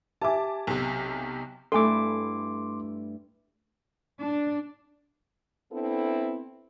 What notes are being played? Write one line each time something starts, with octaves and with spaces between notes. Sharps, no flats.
G4 E5 G#5 A5 D6
B1 C3
G2 A3 E4 A4 G#5 C6 D6
D4
B3 C4 D4 E4 A4